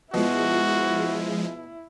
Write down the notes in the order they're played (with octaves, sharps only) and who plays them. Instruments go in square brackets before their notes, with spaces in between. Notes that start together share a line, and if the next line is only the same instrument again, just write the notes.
[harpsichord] B2 [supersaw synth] F3 G#3 [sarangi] E4 [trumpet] F#4